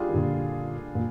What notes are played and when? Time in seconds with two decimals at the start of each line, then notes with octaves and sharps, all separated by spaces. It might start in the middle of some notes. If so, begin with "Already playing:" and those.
Already playing: G3 D4 F4 G#4
0.09 D#3
0.14 A#2 D3
0.95 A#2